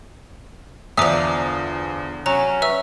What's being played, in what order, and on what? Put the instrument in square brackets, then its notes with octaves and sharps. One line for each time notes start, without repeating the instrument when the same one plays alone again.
[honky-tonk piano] E2 D#6 [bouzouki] D3 F3 [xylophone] E5 A#5 D6
[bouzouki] F#3 [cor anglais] C#4 [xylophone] A#5
[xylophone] B4 E5 E6